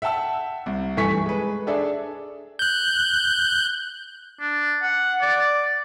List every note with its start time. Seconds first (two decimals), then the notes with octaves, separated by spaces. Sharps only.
0.02 E5 F#5 G5 A5 E6
0.66 C2
0.97 G2 E3 A3 G#5 C#6 B6
1.26 G#3 B4
1.67 D4 G#4 A4 D5 E5
2.59 F#6 G6
4.40 D4
4.83 F#5
5.21 D5